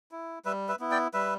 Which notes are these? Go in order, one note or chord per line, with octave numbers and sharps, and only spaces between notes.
E4
G3 B4 E5
B4 E5
B3 E4
D5 G5
G3 B4 E5